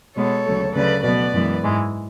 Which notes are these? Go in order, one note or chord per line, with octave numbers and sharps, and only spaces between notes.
B2 G#3 B3 A4 C#5
D2 C#3 F#3 A3
D2 C#3 F#3 A3 B4 D5
B2 F#3 B3 B4 D5
F#2 E3 G#3 B3
G#2 E3 G#3